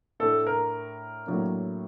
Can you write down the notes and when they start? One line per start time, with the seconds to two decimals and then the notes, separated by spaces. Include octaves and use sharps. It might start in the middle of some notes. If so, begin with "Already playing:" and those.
0.20 A2 A3 D4 A4
0.47 A#4
1.27 A2 F#3 A#3 D4